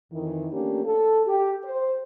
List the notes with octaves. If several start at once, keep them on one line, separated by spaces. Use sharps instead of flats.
F2 D#3 E3
F3 A3 A#3 C#4 D4 G4
A4
G4
C5